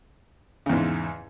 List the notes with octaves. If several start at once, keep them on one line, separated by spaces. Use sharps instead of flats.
E2 G#2 C#3